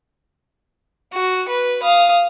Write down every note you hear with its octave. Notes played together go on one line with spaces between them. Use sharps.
F#4
B4
F5 D#6